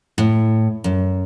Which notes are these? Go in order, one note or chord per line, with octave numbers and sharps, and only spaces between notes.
A2
F#2